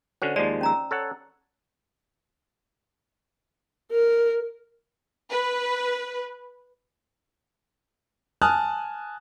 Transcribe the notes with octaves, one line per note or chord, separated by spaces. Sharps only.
D3 C#4 F#4 C5
D#2 F3 G#3 D5
C#4 A#5 E6
A4 C#5 F#5
A#4
B4
G#5 A5 D#6 F6 F#6